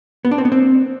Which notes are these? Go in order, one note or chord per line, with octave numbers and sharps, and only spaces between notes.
B3
D4
C4
B3
C4